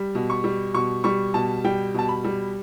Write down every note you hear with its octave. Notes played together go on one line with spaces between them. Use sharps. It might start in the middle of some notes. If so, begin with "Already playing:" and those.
Already playing: G3
B2
C#6
G3
B2 C#6
G3 C#6
B2 A5
G3 G5
B2 A5
B5
G3